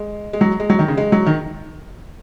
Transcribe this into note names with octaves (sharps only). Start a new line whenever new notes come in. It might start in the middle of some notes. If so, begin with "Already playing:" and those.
Already playing: G#3
G#3
F#3
G#3
F#3
D#3
C#3
G#3
F#3
D#3